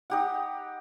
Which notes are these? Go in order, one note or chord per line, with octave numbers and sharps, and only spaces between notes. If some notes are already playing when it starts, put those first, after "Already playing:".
D#4 G4 F#5